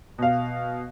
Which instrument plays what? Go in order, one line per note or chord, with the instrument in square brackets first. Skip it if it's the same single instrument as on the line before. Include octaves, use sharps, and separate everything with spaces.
[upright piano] B2 F5